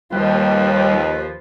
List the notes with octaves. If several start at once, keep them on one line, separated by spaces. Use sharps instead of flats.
D#2 F3 G3 B4